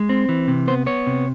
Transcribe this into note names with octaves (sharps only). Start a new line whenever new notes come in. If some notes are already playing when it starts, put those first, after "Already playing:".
Already playing: G#3
C4
E3
C3
B3 C5
B3 C#5
C3